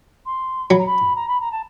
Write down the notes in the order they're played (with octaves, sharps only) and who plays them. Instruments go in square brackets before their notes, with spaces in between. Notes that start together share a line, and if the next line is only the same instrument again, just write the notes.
[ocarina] C6
[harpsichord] F#3 [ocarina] B5
[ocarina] A#5
B5
A#5
B5
A#5
A5